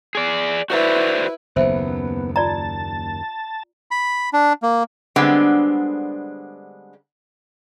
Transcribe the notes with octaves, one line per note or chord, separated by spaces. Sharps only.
G#4 D5
E4 F#4 B4 C5 D5
F#1 D#2 B3 C5 E5
F4 D5 A5 A#5
B5
D4
A#3
D3 G3 G#3 B3 C4 D4